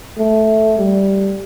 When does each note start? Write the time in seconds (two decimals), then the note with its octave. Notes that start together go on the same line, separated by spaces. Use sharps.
0.18 A3
0.78 G3